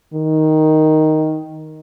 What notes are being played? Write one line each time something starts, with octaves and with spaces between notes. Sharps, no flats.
D#3